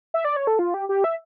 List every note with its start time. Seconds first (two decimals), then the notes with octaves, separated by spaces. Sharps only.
0.14 E5
0.25 D5
0.36 C#5
0.47 A4
0.59 F4
0.74 G4
0.89 G4
1.04 E5